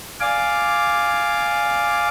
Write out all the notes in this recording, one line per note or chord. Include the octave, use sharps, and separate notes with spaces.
D5 F5 G#5 D6